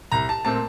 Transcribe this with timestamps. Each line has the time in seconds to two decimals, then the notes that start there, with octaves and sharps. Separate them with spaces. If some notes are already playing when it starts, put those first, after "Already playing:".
0.12 C2 A#5
0.29 A5
0.45 A#2 A3 C4 A5